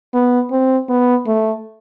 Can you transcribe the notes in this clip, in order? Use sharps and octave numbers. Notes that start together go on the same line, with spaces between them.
B3
C4
B3
A3